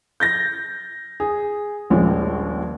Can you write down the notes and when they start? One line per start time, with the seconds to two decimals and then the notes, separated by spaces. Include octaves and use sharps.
0.20 G6 A6 A#6
1.20 G#4
1.90 D#1 A#1 G#3 C#4 F4